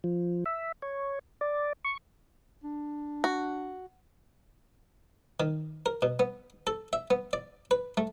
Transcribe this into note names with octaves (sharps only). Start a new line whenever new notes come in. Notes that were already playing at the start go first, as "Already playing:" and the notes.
F3
E5
C#5
D5
C#6
D4
F#4
D#3
A#4
B2
B3
A4
E5
B3
D5
B4
A3